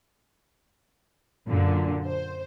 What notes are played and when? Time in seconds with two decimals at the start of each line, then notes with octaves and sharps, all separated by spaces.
1.47 F#2 A#2 D3
2.06 C5